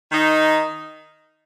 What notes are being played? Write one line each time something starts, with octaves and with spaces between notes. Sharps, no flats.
D#3 D#4